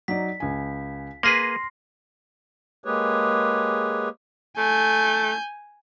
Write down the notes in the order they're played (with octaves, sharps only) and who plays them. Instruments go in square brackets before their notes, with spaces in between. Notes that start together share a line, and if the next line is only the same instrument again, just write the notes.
[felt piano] F#3 D#4 D5 [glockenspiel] B6
[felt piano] C#2 G#5
[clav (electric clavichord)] A#3 G#4 B4 [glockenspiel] C6 A#6 C7 [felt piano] F6
[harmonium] G#3 A#3 G4 G#4 B4 C#5
[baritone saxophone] A3 [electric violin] G#5 G6